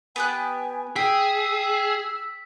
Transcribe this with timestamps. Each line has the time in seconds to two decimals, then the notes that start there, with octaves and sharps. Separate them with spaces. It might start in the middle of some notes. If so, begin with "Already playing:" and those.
0.16 B3 G4 G#5 F#6
0.96 G#4 G5 E6 B6